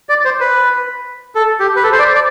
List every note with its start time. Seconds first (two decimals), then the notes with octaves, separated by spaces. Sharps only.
0.09 D5
0.25 C5
0.41 B4
1.35 A4
1.60 G4
1.76 B4
1.83 A4
1.92 C5
1.99 D5
2.15 D5